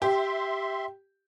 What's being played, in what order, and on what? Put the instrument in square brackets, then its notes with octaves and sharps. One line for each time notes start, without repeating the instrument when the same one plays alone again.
[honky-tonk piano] G4 [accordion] E5 C6